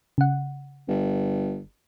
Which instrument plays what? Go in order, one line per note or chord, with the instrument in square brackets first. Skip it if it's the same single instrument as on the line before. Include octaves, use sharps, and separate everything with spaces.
[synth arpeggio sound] C#3 F#5
[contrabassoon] G1